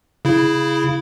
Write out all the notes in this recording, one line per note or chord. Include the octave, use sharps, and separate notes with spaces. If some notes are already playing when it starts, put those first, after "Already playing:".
C#3 E4